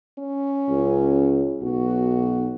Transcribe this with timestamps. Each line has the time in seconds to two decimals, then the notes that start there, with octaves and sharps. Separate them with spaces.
0.19 C#4
0.70 C#2
1.63 B1 F#4